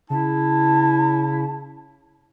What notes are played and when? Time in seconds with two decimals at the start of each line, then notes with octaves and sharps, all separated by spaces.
0.10 C#3 E4 A5